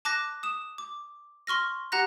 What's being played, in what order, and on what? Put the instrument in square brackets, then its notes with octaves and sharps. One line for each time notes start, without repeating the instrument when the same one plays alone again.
[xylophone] A5 D6 F#6 A#6
D#6 E7
D6
C6 C#6 F6 A#6
G4 F#5 A#5 F#6 A#6